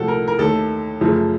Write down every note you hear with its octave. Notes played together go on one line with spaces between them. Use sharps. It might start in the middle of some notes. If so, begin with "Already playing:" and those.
Already playing: C2 A#2 F3 A3 F#4 A4
A#4
A#4
D#2 D#3 A3 A4
F#2 C#3 F3 A3